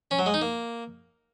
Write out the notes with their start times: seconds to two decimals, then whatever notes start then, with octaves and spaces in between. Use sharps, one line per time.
0.11 C#4
0.19 F#3
0.26 G#3
0.34 D#4
0.41 A#3